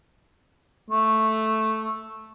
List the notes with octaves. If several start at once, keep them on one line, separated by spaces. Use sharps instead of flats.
A3